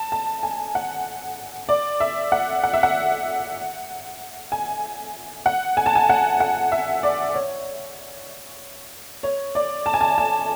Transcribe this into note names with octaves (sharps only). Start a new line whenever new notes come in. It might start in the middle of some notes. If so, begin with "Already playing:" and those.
Already playing: A5
A5
G#5
F#5
D5
E5
F#5
F#5
E5
F#5
G#5
F#5
G#5
A5
G#5
F#5
F#5
E5
D5
C#5
C#5
D5
A5
G#5
A5
A5